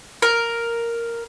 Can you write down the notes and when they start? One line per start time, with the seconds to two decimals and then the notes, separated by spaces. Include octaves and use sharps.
0.22 A#4